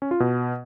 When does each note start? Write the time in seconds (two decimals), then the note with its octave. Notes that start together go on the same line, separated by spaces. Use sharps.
0.02 C#4
0.11 F4
0.20 B2